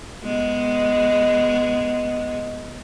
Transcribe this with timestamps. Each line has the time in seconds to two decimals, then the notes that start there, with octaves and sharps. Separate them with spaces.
0.24 G#3 B3